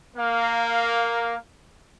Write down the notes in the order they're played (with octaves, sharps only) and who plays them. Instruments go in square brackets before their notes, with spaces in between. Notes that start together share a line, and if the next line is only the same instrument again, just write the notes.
[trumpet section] A#3 F5